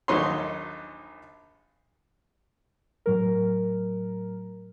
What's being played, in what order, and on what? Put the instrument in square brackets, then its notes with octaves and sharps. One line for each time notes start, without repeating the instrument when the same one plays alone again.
[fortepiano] A#1 D#2 F#3 D#4 C#5 C6
[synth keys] A2 F#3 A#4